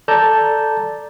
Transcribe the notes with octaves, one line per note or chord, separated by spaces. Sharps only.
A4 D5 A5 A#5 G6